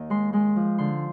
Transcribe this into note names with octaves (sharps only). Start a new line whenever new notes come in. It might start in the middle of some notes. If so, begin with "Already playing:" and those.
Already playing: D#2 D#5
G#3 C6
G#3 C6
F3
D3 C6